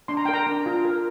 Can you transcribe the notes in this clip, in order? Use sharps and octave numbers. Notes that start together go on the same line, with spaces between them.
D4 C6
A#5
A#4 G5
A#5
D4
F4
A#4